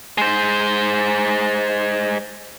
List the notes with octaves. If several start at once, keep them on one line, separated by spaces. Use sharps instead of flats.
G#3 C5